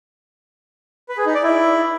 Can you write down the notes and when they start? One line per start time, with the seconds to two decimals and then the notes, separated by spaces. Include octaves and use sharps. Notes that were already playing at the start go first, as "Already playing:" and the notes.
1.09 B4
1.17 G#4
1.26 D#4
1.34 D5
1.43 E4